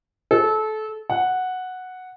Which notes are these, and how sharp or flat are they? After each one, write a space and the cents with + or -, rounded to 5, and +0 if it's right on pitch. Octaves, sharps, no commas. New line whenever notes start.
A4 -25
F#5 -5